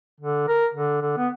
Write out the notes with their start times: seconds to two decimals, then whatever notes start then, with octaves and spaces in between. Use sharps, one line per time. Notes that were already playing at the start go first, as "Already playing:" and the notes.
0.21 D3
0.48 A#4
0.74 D3
1.02 D3
1.17 B3